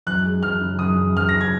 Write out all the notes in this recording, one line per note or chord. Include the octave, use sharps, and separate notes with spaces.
F#2 F#6
G#3
F#2 F6
C#3
F#2 D#6
F#2
F#2 F6
A#6
C#3
G#6